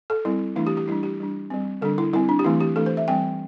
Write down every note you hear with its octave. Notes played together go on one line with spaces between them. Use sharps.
A4
G3 C4 E4
E3 A3 D4 E4
G4
G4
G3 D4 E4
G4
G3 D4
G3 C4
D3 G3 D4 A4
E4
G3 C4 E4
D4
G4
E3 A3 C4 E4
G4
E3 A3 D4 A4
C5
E5
E3 G3 C4 G5